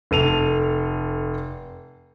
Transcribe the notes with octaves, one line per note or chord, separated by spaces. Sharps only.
F1 A4 D#7 F7